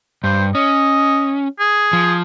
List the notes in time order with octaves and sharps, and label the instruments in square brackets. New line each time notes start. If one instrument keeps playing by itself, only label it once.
[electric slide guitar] G2 [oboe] C5
[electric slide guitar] C#4 [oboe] D#5
[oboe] G#4
[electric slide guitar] F3